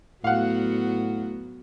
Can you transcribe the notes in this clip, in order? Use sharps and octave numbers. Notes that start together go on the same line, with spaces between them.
A2 F#3 B3 F#4 F5 F#5